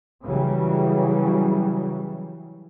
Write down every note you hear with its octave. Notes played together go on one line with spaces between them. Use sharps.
C#3 E3 F#3 G3